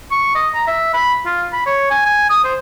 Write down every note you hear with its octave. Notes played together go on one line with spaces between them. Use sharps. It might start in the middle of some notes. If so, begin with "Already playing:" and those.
C#6
D#5
A#5
E5
B5
F4
B5
C#5
G#5
G#5
D#6
C5